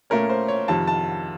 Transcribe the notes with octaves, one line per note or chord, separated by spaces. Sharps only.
A#2 A3 C#4 A#4
C5
C#5
F2 C3 D#3 A5
A5